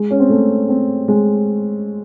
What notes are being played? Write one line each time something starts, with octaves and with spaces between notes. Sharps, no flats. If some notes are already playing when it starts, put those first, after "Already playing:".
Already playing: G#3
C#4
C4
A3
C4
G#3